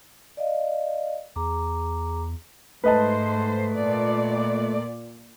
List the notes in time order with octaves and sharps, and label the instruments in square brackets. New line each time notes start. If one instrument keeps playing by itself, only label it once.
[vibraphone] D5 D#5 F5
[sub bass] E2 [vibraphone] G#4 A#5 D6
[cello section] G#2 C5 [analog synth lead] A3 [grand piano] B4 D#5 A5
[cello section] A#2 D5